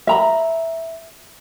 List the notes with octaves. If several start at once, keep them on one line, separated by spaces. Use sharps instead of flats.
E5 A#5 B5